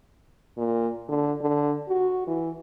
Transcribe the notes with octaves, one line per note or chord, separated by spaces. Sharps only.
A#2
D3
D3
F#4
E3